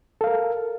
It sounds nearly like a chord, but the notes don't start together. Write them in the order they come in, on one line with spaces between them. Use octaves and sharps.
A4 F5 A#4